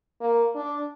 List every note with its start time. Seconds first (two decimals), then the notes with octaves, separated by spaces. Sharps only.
0.21 A#3
0.55 D4